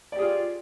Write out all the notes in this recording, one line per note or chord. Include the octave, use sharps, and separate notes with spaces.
F4 G4 G#4 D5